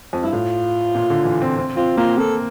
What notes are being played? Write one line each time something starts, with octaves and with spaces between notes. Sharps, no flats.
F2
G2 E4
A2 F4
A#2
D3
E3
C4
C4
C4 F4
A#3 F4
A#3 A4